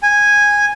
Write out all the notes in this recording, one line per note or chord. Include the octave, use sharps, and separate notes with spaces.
G#5